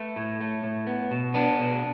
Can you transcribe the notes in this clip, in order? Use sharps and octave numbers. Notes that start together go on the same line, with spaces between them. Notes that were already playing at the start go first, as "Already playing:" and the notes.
Already playing: A3 B4
A2
A3
A2
B3
B2
B3 D4
B2